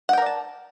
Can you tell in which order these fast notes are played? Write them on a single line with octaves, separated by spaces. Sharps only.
F#5 G5 A#4 D5 A5